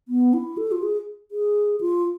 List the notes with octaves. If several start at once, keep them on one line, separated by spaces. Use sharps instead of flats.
B3
E4
A4
F4
G#4
G#4
F4